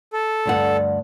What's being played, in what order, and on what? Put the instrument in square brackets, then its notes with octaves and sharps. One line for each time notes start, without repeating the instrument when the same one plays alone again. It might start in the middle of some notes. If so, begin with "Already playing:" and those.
[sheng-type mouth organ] A4
[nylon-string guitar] D2 G2 F#5